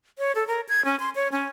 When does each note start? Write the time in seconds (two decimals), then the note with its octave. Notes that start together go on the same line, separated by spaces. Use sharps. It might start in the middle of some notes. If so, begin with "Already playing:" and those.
0.19 C#5
0.35 A4
0.47 A#4
0.69 G#6
0.85 C#4
1.00 C6
1.15 C#5
1.32 C#4